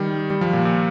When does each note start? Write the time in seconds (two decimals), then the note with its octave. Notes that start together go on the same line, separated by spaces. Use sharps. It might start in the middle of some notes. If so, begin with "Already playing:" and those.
Already playing: D#3 G3
0.30 G3
0.41 F3
0.53 A#2
0.65 A#2